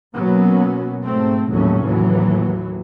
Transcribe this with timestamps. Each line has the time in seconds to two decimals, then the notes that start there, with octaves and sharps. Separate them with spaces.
0.15 B2 F#3 A#3 B3 C#4
1.02 G#2 A3 C4
1.49 F1 D#2 A2 F#3 A3 C#4
1.83 D#2 A2 E3 F#3